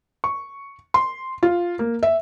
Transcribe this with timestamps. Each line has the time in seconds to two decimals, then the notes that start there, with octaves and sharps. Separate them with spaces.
0.24 C#6
0.94 C6
1.43 F4
1.79 A#3
2.03 E5